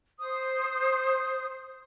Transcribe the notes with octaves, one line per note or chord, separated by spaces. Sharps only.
C5 D#6